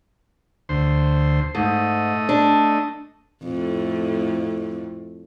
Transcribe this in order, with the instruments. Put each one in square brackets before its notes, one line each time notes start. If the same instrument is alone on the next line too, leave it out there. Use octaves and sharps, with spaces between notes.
[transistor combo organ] D2 C5
[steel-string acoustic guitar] G#2 [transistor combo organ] A3 D#5
[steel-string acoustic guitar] D4
[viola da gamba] F2 A2